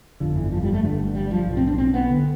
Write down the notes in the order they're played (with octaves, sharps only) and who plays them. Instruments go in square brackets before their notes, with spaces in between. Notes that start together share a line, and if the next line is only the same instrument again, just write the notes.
[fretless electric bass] G1 F2 D3 F3
E3
F3
G3
A3
G1 G2 D3
G3
F3
B1 A2
C4
D4
C4
B3
D3